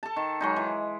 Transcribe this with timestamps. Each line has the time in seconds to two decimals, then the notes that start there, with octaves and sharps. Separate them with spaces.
0.03 A4 A5
0.16 D#3
0.41 F#3 G#3 D#4
0.56 E3